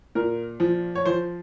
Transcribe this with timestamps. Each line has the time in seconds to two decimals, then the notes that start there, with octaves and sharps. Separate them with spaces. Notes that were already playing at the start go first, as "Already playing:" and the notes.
0.15 A#2 A#4
0.60 F3
0.95 C#5
1.06 F3 C5